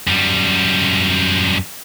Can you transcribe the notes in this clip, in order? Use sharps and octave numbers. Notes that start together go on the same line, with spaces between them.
F#2 G3